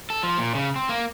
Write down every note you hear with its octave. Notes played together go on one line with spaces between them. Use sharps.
A4
F3
A#2
C#3
C4
A#3